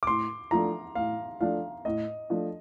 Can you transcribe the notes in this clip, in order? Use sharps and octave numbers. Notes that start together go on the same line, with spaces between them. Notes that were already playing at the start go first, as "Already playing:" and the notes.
D6
A2 C6
F3 A3 D4 A#5
A2 F5
F3 A3 D4 F5
A2 D#5
F3 A3 D4